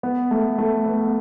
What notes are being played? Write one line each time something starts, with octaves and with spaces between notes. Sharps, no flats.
B3
A3
A3
B3